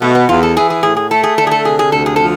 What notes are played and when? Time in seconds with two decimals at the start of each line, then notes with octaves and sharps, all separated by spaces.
0.02 B2 A3
0.15 B3
0.28 E2 F4
0.43 A4
0.55 E3 G#4
0.70 G#4
0.83 A2 G#4
0.97 G#4
1.10 A3 A4
1.23 G#4
1.38 D3 A4
1.47 G#4
1.51 A4
1.64 C3 G#4
1.79 G#4
1.92 D2 A4
2.06 G#4
2.16 F3 A4